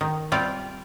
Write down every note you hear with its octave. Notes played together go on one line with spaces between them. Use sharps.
D#3
G3 C4 F4 D5